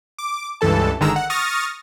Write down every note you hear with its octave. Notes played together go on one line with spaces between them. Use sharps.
D6
C#2 G2 E3 A4 A5
G1 D3 D#3 G#3 A#5 E6
F#5
C#6 D#6 F6 A6 A#6